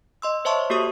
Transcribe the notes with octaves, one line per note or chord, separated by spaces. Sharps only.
D#5 C6 E6
C5 C#5 E5 A5 C6 C#6
A#3 F#4 G4 A4 C#6 D#6